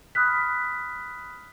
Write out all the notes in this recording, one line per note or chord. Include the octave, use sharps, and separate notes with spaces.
B5 D#6 F6 F#6 B6